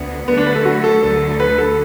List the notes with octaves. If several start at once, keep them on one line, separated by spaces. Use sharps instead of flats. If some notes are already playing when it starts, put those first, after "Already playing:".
Already playing: D2 B3
D3 F#3 A3 B3
D4
B4
A4
F#4
A4
D2 D3 F#3 A4
B4
A4